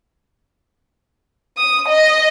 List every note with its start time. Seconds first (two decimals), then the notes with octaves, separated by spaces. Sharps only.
1.57 D#6
1.88 D#5